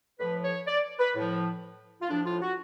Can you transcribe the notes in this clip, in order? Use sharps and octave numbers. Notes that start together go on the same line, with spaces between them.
A2 F3 B4
C#5
D5
B4
A2 F3
F4
A2 F3 D4
F4
F#4